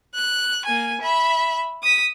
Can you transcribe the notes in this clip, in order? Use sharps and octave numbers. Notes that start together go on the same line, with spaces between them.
F#6
A#3 G#5
E5 B5
D#6 B6